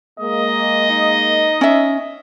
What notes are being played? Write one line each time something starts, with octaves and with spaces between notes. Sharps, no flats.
G#3 A#3 D#5
D#4
C#4 E5